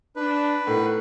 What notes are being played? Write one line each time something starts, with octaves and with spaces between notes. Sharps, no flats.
D4 B4
A2 D#3 B3